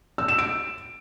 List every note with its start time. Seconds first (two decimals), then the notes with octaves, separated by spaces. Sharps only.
0.18 E6
0.28 E7
0.38 D7